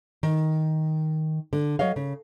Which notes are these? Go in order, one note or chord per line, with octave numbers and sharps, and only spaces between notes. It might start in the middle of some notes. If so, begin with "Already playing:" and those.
D#3
D3
F#3 C#5 D#5 F5
C#3